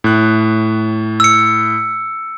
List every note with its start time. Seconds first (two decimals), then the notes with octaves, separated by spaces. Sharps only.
0.04 A2 F#6
1.20 E6 C#7